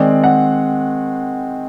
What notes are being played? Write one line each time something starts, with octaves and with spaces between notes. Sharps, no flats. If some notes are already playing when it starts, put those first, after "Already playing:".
Already playing: D#3 G#3 C4 D5
F#5